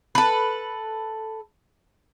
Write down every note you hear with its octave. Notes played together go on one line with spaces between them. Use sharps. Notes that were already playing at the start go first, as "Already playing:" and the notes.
A4 B4